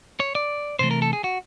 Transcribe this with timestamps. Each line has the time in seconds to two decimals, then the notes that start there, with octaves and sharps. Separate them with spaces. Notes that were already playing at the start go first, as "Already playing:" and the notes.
0.20 C#5
0.35 D5
0.79 C3 E3 A3 C5
0.91 A#4
1.02 A4
1.13 G#4
1.24 F#4